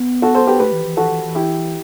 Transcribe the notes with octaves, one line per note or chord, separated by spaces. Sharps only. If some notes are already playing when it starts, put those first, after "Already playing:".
Already playing: B3
F#4 A4
A4 C5
G4 B4
A3 G4 B4
E3
E3
E3 F#4 A4
E3
E3
E4 G4